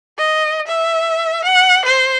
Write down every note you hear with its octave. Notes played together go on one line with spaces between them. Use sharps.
D#5
E5
F#5
C5